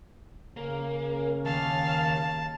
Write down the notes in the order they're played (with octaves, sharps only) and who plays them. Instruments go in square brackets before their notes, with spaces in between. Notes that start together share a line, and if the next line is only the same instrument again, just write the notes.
[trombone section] C#3 C#4 [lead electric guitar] A#3
[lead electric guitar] D#2 [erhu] F5 [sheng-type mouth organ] A5